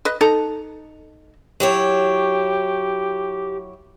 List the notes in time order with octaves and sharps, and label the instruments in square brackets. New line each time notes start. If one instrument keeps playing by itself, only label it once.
[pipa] B4 D#5
D#4 A4 A#5
[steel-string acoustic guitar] F#3 E4 C#5 [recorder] G4